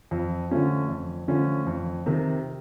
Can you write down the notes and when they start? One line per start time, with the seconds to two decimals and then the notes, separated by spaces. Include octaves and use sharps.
0.11 F2
0.51 D3 F3 A3 C#4
0.89 F2
1.28 D3 F3 A3 C#4
1.67 F2
2.06 C3 D#3